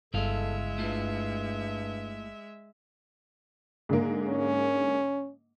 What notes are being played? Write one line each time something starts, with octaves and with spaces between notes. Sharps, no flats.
G1 C#2 G#3 E4 A4 E5 F5
G2 A3 E4 F4
G#2 D3 A#3
C#4